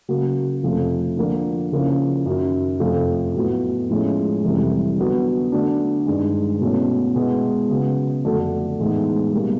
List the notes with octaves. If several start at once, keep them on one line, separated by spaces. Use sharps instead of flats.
C#3 F#3 A#3
F2 C3 F3 A3
D3 F3 A#3 D4
C#3 F3 A#3 C#4 E4
F#2 D#3 F#3
F2 C3 F3 A3
A2 F#3 B3
A2 F3 G#3 C#4
F2 C3 E3 G3
D3 F#3 B3
D3 F#3 A3 D4
G2 D#3 G#3
B2 F#3 A3 C#4 E4
B2 G#3 B3 E4
C#3 F#3 B3
F2 D3 F#3 A3 D4
A2 E3 G#3 B3 D#4
B2 G3 A#3